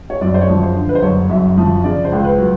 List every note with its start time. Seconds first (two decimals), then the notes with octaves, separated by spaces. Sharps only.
0.10 C#5
0.21 F#2 D5
0.34 C5
0.41 C#5
0.49 F3
0.63 C5
0.76 D3
0.89 B4
0.95 C5
1.02 F#1 C#5
1.29 F#2 E5
1.57 F3
1.84 C#3 D5
2.05 C5
2.12 C#2
2.24 B4
2.38 F#3